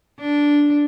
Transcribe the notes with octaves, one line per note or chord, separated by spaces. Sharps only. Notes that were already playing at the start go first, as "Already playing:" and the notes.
D4